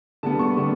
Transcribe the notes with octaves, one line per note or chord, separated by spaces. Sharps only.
D3 G3 B3 A5
C#6
D3 G3 B3